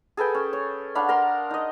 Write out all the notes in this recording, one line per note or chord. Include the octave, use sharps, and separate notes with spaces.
G#4 A4 B4 G5
C#4
C#5
D4 F5 F#5 B5
A#4 A#5 C6
D#4 D#5